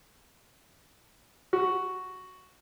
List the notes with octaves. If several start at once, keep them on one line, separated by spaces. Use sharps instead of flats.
F#4